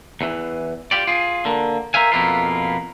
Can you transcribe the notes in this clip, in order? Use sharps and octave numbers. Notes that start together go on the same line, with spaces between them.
E2 E3
F4 G4 D5
F4 G#4
D3 A#3
A#4 C5 E5 F5 G#5
F2 B2 A#3 B3 E4 F4